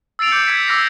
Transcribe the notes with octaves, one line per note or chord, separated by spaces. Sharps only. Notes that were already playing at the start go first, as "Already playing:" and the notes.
E6 A6 C7 D7 F7
D6 G6 C#7
E6 G#6 B6 D7
D6 E6 F6 A#6 C7